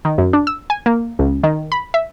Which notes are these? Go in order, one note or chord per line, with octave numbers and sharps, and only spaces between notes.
D#3
F#2
D4
E6
G#5
A#3
C#2
D#3
B5
E5